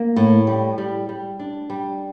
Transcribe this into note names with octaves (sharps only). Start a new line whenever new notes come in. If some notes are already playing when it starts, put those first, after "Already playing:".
Already playing: A#3
A2
G3
G3
G3
D4
G3